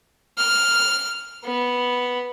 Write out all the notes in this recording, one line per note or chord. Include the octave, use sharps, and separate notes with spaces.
F6
B3